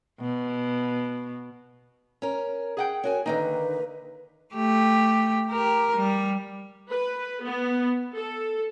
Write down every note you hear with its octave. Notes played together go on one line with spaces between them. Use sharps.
B2
C#4 A#4
G#4 F#5 G5
C#4 F#4 A#4 G#5
D3 D#3 A#3 D#4 B4
A3 G4
G4 A#4
G3
B4
B3
A4